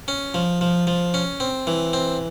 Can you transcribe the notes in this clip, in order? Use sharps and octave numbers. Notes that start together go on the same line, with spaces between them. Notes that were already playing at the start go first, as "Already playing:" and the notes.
C#4
F3
F3
F3
C#4
C4
E3
C4